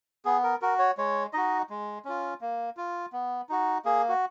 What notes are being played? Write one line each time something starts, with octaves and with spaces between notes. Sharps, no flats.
B3 G#4
A#4
F#4 A#4
C#5
G#3 C#5
D#4 F#4 D#5
G#3
C#4 F4
A#3
F4
B3
D#4 F#4
A#3 G#4
F#4